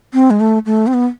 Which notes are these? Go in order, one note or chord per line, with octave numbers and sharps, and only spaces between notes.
C4
G#3
A3
A3
C4
B3